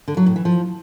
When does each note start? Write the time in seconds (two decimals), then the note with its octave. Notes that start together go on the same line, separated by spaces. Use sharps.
0.08 D3
0.17 F#3
0.26 A2
0.36 E3
0.45 F3